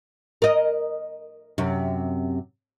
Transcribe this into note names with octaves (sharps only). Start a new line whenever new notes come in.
A#4 D#5
F#2 C3